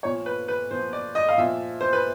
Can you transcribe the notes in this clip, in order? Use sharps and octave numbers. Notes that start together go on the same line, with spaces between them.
A#2 F3 C#5
B4
B4
A#2 F3 C5
D5
D#5
F5
A#2 F3 E5
C5
B4